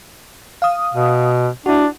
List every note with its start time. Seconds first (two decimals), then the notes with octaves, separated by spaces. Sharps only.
0.62 F5 D#6
0.94 B2
1.66 D4 E4 F#4